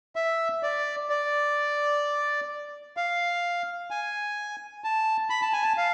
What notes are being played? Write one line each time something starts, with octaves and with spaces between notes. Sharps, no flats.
E5
D5
D5
F5
G#5
A5
B5
A5
G#5
A5
F5